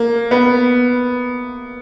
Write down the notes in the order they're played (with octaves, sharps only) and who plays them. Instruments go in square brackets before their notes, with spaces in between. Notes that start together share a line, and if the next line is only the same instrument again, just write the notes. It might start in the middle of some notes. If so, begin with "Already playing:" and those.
Already playing: [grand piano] A#3
B3